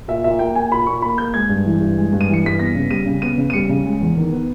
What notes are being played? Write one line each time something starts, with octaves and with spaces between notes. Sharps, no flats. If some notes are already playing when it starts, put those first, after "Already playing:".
A#2 E5
A#2 E5
A#3 G5
A#3 G#5
A#2 B5
A#2 C#6
A#3 B5
A#3 G6
G#3 G#6
G2
E3
G2
G#3
G2
D#7
E3 C#7
G2 B6
B3 A#6
C#3
G3 D#7
C#3
B3 D#7
C#3
D#7
G3 C#7
C#3
G#3
E2
D#3
B3